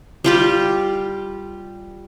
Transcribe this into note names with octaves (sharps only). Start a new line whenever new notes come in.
G3 F4 G4